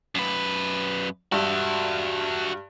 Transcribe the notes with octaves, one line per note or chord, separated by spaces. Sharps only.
F#2 B4
G2 F#4 E5